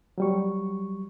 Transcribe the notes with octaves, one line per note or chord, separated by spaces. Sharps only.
F#3 G3 C#6